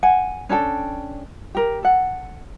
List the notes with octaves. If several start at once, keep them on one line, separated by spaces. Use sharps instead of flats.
F#5 G#5
C#4 D4 A4 G5
G4 A#4
A4 F#5